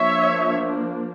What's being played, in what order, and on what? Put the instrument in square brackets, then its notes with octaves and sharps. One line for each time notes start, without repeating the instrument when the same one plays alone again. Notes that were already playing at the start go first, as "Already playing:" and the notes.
Already playing: [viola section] F3 A#3 D4 C#5 E5